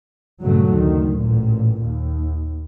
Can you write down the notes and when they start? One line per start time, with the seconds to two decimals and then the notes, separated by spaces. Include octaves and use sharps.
0.40 G2 A#2 C#3 F#3 A3
0.73 F#1 D2 D#3
1.18 A1 A#2
1.81 D#2